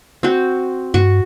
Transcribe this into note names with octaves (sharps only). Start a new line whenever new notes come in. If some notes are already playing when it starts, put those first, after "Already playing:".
C4 F#4
G2 F#4 C#6